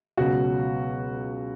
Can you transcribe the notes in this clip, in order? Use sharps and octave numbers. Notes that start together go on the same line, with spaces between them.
C#2 B2 F#3 F#4